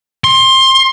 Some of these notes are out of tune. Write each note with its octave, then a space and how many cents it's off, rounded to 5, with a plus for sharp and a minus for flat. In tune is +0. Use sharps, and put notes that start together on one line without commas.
C6 +20